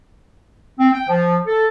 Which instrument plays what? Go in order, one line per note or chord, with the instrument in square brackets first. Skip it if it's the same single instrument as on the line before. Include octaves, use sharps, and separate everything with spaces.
[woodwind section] C4
G5
F3
A4